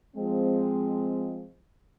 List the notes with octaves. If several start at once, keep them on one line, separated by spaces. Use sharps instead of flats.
F3 G#3 C4